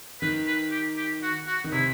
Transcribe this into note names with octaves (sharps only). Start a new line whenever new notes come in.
D#3 B4
B4
G4
G4
F#4
F#4
D#3
C3 E4